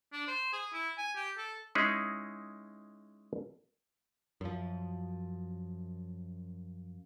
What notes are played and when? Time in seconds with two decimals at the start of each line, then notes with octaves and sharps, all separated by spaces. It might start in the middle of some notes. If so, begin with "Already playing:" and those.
0.13 D4
0.27 C5
0.53 G#4
0.73 E4
0.98 G#5
1.16 G4
1.37 A4
1.75 G#3 C#4 D#4 E4 G#4
4.41 F#2 F3